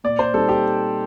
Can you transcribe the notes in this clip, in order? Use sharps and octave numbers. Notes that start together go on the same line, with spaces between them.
A#2 D5
C5
G3 C4 D#4 A4
G4